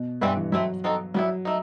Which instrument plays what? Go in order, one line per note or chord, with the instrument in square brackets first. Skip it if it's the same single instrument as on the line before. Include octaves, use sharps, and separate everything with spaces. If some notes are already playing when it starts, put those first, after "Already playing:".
Already playing: [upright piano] B2
[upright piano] G2 [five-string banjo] E3 G3 C4 E4 B4
[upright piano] E3
[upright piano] F#3 [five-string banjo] A3 C4 E4
[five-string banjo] C4 D#4 F#4 A4
[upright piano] F#3 [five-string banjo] G3 B3 E4
[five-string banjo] A3 D#4